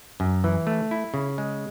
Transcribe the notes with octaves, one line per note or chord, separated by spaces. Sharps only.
F#2
E3
A3
E4
C#3
G#3